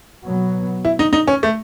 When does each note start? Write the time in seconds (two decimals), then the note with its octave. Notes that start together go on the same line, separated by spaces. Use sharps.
0.26 B2 F#3 B3
0.85 E4
0.99 D#4
1.13 D#4
1.27 C#4
1.43 A3